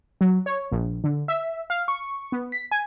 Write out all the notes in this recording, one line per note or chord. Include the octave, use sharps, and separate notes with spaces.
F#3
C#5
A#1
D3
E5
F5
C#6
B3
B6
G#5